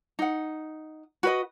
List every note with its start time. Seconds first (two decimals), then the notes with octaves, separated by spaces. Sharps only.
0.19 D#4 F#5
1.23 F#4 B4 D#5